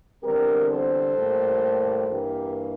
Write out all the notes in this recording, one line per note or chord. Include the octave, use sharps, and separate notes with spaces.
E2 D3 G3 C4 G4 A#4
A4 C5
A2 G3 A#3
G2 E3 A#3 G4 A#4